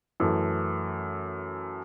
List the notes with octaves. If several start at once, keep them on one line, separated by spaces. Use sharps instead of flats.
F#2 E3 A3